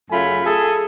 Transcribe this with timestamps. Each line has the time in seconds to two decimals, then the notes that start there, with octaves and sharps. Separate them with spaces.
0.11 F#2 C#3 A3 F4 G#5 B5
0.45 G#4 A4